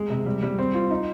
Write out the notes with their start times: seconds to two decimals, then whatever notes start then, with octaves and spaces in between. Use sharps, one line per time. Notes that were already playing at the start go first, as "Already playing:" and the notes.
Already playing: G#3
0.10 C3
0.26 G3
0.42 G3
0.58 C4
0.74 F4
0.90 D#4